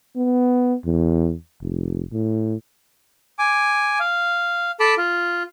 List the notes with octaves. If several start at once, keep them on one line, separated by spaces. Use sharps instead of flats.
B3
E2
F1
A2
G#5 D6
F5
A4 A5 B5 D6
F4